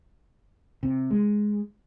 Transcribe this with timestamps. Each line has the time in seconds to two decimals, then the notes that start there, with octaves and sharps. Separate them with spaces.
0.83 C3
1.11 G#3